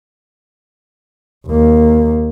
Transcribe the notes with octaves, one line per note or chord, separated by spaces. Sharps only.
D#2 A#3